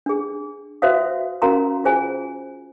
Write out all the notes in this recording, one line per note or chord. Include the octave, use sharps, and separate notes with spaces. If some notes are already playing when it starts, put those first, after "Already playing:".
D4 G#4
F#4 B4 C5 E5 F5 D#6
C#4 F#4 A#4 F5 A#5 C6
F4 G#4 C5 G#5